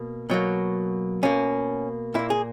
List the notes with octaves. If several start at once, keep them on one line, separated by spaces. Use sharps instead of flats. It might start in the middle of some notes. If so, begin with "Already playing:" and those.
Already playing: B2 A#3
B2 F#3 A#3
B2 A#3 C#4
A#2 A#3 E4
G#4